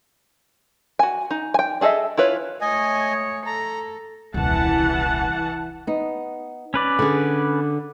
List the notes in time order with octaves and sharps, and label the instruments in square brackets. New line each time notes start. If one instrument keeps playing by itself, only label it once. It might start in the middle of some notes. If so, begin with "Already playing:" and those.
[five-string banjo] F#4 G#5
D#4
G5 G#5
D4 G#4 A4 D#5 E5
E4 F4 B4 C#5
[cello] A3 C#5 [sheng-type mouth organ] D#5 G#5
[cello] A4 [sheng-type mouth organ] A#5
[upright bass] D#1 C2 [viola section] E3 F#5 A5
[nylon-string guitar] B3 D#4
[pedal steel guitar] C#4 B4 D5
[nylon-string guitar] D3 G#4